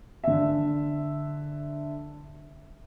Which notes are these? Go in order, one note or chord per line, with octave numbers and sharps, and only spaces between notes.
D3 E5